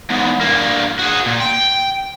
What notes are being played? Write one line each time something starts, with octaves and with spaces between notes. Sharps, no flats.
E2 G#2
G2 A#3
F#4 G#4
A#2
G5